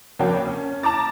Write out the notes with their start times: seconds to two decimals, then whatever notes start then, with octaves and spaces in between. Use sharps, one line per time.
0.19 F2 A#3 D4 F#4 C#5 G5
0.45 C#4
0.83 A5 A#5 D6 A6